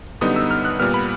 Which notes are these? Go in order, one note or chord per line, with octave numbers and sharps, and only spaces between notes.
F#2 D3 G3 B3 D#4 D#6
E6
F6
F#6
A#2 G3 B3 F6
B5